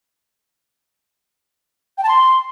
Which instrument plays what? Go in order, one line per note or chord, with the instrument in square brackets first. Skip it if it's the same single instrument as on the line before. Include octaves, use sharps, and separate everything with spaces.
[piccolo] G5
A5
C6